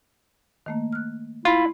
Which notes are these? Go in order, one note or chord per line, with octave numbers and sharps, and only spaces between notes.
D#3 A3 A#3
F6 F#6
E4 F4